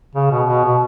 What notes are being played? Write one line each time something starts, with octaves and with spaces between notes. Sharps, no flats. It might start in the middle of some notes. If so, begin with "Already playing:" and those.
C#3
B2
B2
B2